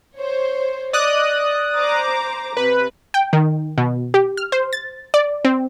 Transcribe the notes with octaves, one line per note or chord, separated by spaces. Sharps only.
C5 C#5
D5 D#5 D#6 F#6
C5 A#5 D6
C3 B4
G5
D#3
B2
G4
F6
C5
A6
D5
C4